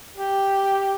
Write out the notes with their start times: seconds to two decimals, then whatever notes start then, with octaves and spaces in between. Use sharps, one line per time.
0.16 G4